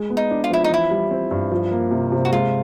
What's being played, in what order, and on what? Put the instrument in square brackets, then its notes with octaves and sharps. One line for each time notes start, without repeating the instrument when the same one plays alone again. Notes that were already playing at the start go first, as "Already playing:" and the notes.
Already playing: [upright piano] G#3
B3
[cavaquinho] D#4
[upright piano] D4
[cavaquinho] F4
[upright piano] F3 [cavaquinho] E4
[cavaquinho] D#4
[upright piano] E3 [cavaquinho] E4
[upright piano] G3
C4
G2
F3
A#3
C3
C3
[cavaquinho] F#4
[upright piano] G#3 [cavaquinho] F4